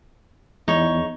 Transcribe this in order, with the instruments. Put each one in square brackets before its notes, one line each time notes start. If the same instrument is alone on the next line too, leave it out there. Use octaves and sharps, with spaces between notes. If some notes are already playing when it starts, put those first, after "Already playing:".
[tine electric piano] E2 [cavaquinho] D#4 C#5